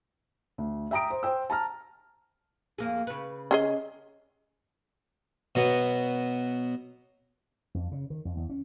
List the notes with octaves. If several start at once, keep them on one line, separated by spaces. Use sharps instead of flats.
D2
E5 G5 A#5 D#6 D7
C5
C5 G5 E6
A5 A#5 F6
F2 A#3 G#4
C#3 B4
C#4 G#4 D#5
B2 F#3 B3
F2
C#3
D#3
F2
E2
C#4